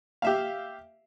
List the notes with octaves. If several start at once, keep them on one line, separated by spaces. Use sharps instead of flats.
G4 E5 F5